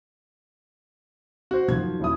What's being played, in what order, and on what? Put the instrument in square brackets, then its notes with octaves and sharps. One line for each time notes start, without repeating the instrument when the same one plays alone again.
[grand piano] F#4 C5
[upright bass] F#2 D#3 [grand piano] F3 G#6
[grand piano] D#1 E4 D#6